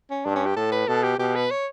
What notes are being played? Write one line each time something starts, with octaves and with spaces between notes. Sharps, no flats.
C#4
G2 D4
C#4
G4
A2 A4
B4
B2 A4
G4
B2 G4
B4
C#5